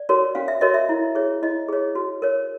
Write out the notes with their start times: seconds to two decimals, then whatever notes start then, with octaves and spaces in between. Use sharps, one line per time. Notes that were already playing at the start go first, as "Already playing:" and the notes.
Already playing: D5
0.09 F#4 A#4 C#5
0.35 C#4 F5
0.48 E5
0.61 F#4 A#4 C#5 D#5
0.74 E5
0.89 E4
1.15 G#4 C#5
1.43 E4 D#5
1.69 G#4 C#5
1.95 F#4
2.22 A#4 C#5